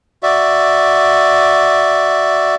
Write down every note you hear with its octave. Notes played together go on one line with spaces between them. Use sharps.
F#4 D5 E5